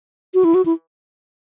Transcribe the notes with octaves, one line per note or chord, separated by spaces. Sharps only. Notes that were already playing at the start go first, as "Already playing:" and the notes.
F#4
E4
F#4
E4